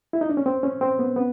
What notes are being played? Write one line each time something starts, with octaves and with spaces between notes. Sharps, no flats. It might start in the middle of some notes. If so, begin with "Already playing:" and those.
E4
D#4
D4
C#4
C4
C#4
C4
B3
B3